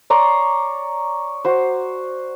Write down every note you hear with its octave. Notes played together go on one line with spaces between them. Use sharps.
C#5 D5 A#5 C6
F#4 C5